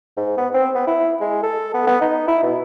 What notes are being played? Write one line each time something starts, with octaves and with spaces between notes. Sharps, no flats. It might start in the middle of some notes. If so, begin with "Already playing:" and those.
G#2
B3
C4
B3
E4
G#3
A4
B3
B3
D#4
E4
B2